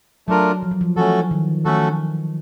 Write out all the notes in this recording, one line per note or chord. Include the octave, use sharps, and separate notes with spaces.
F#3 A3 D4 F4 A#4
F3
F#3
F3
E3 A3 C#4 F#4 A4
D#3
D#3 A3 C#4 F#4 A4